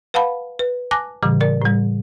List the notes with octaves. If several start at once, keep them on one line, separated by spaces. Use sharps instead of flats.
B4 F5 F#5 A5 B5
B4
G#5 A5 D6 F#6 A#6
A2 C#3 E3 G3
A#4 D5
A2 G3